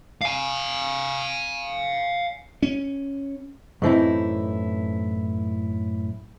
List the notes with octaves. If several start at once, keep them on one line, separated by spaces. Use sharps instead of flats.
F5 G#5
C#4
F#2 A2 E3 C4 D#4 E4